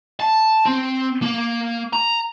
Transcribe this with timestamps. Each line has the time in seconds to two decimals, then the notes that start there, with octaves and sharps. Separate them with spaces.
0.20 A5
0.66 C4
1.22 A#3
1.93 A#5